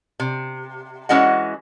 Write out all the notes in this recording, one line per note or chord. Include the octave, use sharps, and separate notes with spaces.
C3
E3 G#3 C#4 F#4 D#5 F#5